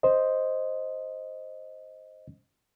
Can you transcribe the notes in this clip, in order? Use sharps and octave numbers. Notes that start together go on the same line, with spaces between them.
C5 D#5